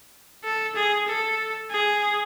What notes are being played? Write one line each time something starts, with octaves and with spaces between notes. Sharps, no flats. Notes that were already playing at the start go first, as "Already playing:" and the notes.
A4
G#4
A4
G#4